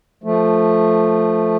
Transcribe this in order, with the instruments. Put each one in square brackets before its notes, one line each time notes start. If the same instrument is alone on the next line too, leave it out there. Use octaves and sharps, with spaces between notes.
[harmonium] F3 A3